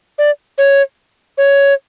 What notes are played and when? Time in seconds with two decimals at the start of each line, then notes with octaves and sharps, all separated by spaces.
0.18 D5
0.58 C#5
1.38 C#5